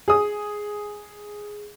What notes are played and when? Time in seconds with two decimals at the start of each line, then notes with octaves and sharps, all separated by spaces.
0.08 G#4 D#6